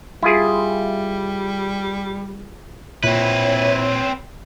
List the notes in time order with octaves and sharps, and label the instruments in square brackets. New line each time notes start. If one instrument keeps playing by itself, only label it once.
[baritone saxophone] G3 [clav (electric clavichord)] E4 F4 G#4
[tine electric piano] A#2 [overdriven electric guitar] C4 B4 [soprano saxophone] E4 [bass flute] C#5